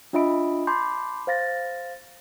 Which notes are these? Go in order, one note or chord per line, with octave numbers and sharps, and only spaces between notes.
D4 F4 D#5 E5 B5 D7
A5 B5 C6 D6 G6
C5 F5 A6 A#6